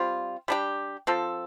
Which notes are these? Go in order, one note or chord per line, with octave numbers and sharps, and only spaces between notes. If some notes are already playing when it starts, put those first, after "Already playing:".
Already playing: G3 C4 F4
G3 D4 G4
F3 C4 A4